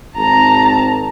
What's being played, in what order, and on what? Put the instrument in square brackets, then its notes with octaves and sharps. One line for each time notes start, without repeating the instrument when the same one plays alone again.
[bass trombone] G#1 [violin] A5 A#5